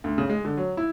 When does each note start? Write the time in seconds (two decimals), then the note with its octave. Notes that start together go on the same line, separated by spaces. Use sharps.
0.04 D2
0.18 C#3
0.29 G#3
0.45 D3
0.57 F#3
0.77 E4